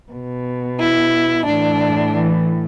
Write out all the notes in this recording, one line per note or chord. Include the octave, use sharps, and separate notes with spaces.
B2
E4
A2 E3 D4
E3